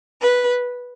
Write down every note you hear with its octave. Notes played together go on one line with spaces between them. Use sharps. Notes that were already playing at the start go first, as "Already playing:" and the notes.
B4